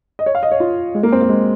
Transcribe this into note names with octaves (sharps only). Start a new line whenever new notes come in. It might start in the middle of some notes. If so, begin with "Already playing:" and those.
D#5
C#5
F5
D#5
C#5
F4
G#3
A#3
C4
A#3
G#3